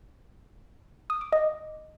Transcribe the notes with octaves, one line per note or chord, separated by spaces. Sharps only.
D#6
D6
D#5